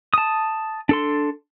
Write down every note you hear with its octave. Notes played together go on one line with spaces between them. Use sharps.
A5 D#6
D4 A4 C6